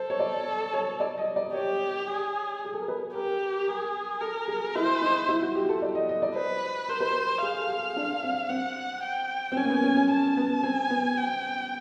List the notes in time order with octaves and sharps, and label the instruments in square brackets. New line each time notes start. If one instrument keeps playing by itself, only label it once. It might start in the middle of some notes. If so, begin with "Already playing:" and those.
Already playing: [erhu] A4 [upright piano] C5
[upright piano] C#5
D5
C#5
D5
D#5
D5
[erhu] G4 [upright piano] C#5
[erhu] G#4
[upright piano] G#4
A4
A#4
B4
[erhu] G4 [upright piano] A#4
[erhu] G#4 [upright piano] A#4
[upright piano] A4 [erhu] A#4
[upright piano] G#4
[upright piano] E4 [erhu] C5
[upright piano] D#4
E4
F#4
G4
A4
D5
D#5
D#5
D5
[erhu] B4 [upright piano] C5
[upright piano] A#4 [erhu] C5
[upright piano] B4
A#4
[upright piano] G#4 [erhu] F5
[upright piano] A4
G#4
D4
C4
[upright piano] C4 [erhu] F#5
[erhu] G5
[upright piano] C4
[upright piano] C#4 [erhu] G#5
[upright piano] A#3
B3
C#4
C#4
[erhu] A5
[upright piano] B3
[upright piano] C4 [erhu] G#5
[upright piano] B3
[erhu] G5